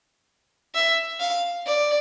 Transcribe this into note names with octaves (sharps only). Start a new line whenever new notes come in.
E5
F5
D5